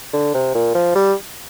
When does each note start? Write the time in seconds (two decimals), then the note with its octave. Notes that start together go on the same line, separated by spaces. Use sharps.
0.13 D3
0.34 C3
0.55 A#2
0.74 F3
0.95 G3